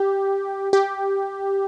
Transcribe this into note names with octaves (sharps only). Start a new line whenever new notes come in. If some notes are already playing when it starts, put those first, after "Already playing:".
Already playing: G4
G4